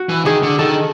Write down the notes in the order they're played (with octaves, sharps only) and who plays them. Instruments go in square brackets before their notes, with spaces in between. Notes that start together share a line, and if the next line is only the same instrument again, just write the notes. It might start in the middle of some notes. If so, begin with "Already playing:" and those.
Already playing: [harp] F#4
[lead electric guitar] E3
[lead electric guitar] D#3 [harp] G#4
[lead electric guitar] D3
[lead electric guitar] D#3 [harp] A4